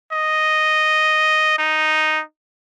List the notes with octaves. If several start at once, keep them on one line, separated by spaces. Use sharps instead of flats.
D#5
D#4